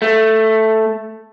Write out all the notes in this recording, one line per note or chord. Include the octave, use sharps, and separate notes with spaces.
A3